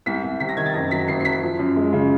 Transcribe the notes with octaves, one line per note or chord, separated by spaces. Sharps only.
C2 B6
C2
C3 B6
A#6
D#3 G#6
A6
F#1 A#6
F#3 B6
F#1 C7
C7
F#1 B6
F3
F#2
G#3
C#3